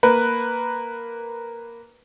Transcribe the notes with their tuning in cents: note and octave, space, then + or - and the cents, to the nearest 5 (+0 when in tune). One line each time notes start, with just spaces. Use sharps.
A#3 +0 B4 +0